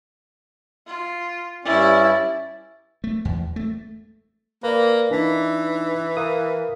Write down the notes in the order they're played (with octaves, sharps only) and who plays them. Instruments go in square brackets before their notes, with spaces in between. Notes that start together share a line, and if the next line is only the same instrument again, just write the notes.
[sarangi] F4
[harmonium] G2 C#4 D5 [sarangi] E4
[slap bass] A3
E2
A3
[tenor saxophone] A#3 [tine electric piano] B4 D5
[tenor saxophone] E3 [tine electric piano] D4 D#4
[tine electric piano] A#4 F5 D#6